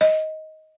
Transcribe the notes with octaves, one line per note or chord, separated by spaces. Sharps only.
D#5